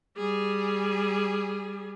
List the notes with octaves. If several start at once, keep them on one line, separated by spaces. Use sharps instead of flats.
G3 G#4